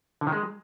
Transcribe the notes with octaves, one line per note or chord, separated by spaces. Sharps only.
D3
D#3
G#3